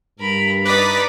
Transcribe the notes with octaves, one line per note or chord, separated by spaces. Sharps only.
G2 A#4 B5
D#4 B4 D5 D6 D#6 B6